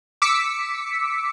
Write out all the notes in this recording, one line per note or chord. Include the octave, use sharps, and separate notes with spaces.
D6 E6 B6 C#7